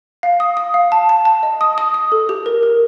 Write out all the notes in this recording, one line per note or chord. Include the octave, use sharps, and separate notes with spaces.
F5
D#6
D#6
F5
A5
A5
A5
D#5
D#6
D#6
D#6
A4
G4
A#4
A#4